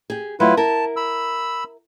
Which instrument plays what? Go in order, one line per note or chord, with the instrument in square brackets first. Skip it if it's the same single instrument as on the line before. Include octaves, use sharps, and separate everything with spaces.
[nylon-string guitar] G4 G#4
[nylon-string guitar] F#3 A3 [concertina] E4 F4 B4
[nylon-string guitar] E4 A#4 [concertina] A5
[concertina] B5 E6